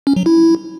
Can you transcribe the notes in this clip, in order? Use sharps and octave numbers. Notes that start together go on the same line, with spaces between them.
C#4
F#3
E4